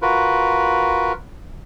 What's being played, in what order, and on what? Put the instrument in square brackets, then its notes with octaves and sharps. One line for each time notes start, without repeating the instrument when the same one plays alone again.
[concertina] F4 F#4 A#4 B4